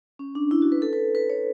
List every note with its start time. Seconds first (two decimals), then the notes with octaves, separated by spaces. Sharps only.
0.19 C#4
0.35 D4
0.51 E4
0.62 F#4
0.72 B4
0.82 A4
0.93 B4
1.15 B4
1.30 C#5